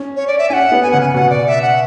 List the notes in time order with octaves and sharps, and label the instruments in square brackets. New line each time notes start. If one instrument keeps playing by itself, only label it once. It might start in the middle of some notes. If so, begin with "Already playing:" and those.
Already playing: [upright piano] C#4
[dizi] C#5
D5
E5
[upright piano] C#4 [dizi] G#5
[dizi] F#5
[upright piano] B3
[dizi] G#5
[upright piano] C#3 [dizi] F#5
[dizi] G#5
[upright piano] B2 [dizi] F#5
[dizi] D5
E5
F#5